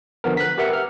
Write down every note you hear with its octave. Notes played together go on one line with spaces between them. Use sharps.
D3 F3 B3 A#4
F#6 B6
G4 A#4 B4 E5 F#5
F6